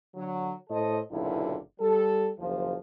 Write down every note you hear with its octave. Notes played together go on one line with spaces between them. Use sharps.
D3 F#3
A2 A4 C5 D#5
F#1 B1 A#2 D3 E4
G3 A4
F#1 D#2 F3